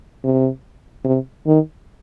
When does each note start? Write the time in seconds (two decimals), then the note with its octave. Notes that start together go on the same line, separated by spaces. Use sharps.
0.24 C3
1.05 C3
1.46 D#3